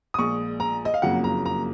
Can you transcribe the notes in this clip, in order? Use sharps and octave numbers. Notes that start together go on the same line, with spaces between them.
D#6
A#1 A#2 G#3 C#6
A#5
D#5
F5
F#1 F2 C#3 F#3 A#3 F#5
A#5
A#5